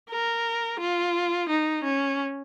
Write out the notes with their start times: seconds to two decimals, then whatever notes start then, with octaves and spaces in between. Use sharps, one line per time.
0.10 A#4
0.80 F4
1.49 D#4
1.84 C#4